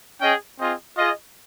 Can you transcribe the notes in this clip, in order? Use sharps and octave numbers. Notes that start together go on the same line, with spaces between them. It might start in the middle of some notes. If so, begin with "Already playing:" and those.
C#4 G#4 D#5 G5
C4 F4 G#4 D#5
F4 G#4 D#5